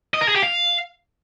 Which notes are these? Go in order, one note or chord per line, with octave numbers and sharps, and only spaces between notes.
D#5
A#4
G#4
G4
F5